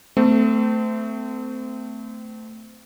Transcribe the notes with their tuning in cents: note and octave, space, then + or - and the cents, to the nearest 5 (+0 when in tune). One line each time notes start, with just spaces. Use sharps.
A3 +10 C4 -30